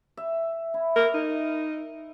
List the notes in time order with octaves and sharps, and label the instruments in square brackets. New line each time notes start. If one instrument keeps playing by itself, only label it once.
[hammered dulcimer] E5
E4
[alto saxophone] A#4
D#4